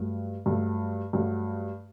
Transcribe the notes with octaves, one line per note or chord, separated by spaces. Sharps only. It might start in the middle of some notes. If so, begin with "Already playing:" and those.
Already playing: G2 F#3 A3
G2 F#3 A3
G2 F#3 A3